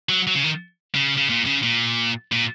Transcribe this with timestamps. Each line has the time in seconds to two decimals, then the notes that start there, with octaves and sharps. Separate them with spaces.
0.09 F#3
0.27 F#3
0.35 C#3
0.43 D#3
0.95 C#3
1.17 C#3
1.29 A#2
1.46 C#3
1.63 A#2
2.32 A#2